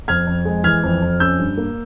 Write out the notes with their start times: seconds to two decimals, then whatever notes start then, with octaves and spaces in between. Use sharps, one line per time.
0.08 F2 F6 G#6
0.27 F2
0.45 G#3
0.64 E3 F6 G#6
0.83 F2
1.02 F2
1.20 C#4 E6 G6
1.39 G2
1.57 A#3